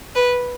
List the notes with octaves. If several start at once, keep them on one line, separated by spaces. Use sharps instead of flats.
B4